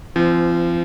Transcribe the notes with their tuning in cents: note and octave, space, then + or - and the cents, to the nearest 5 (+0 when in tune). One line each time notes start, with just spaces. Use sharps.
F3 -35 C4 -15